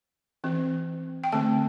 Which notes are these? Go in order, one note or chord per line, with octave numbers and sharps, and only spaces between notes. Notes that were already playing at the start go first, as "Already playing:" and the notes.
E3 C4
G5
D3 A3 C4 A5